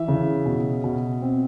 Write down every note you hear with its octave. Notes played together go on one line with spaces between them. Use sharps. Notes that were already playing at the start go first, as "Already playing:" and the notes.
Already playing: E3 E5
C#3
B2
B2
C4